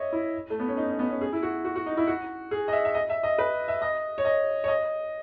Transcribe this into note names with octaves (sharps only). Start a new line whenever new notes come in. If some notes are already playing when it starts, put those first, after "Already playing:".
Already playing: C#5 D#5 E5
E4
A3
B3
C#4
D#4
C#4
B3
C#4
G#4
E4
F#4
F#4
F#4
D#4
E4
F#4
G#4
D#5
E5
E5
D#5
E5
D#5
B4
E5
D#5
C#5
D#5
C#5
D#5